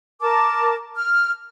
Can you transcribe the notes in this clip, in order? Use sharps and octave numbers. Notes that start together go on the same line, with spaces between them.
A#4 A5 D6
F6